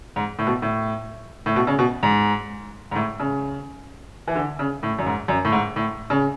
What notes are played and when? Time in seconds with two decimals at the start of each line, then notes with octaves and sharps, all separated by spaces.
0.16 G#2
0.39 A2
0.47 B2
0.62 A2
1.46 A2
1.56 B2
1.67 C#3
1.79 B2
2.03 G#2
2.91 G#2
2.96 A2
3.20 C#3
4.28 E3
4.35 D3
4.59 C#3
4.83 A2
4.99 F#2
5.06 G#2
5.28 F#2
5.45 A2
5.52 G#2
5.76 A2
6.10 C#3